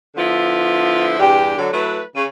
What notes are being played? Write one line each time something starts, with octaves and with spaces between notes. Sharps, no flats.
D3 F3 B3 E4 F4 C5
E2 G2 D4 G4
D3 F#3
F#3 A3 E4 B4
C#3